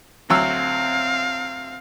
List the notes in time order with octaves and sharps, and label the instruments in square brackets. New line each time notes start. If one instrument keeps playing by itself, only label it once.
[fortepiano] D2 F#3 E6 [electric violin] C4 F5